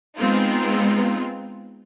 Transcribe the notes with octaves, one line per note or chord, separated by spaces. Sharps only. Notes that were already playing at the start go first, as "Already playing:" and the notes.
G#3 B3 C4 D#4 F4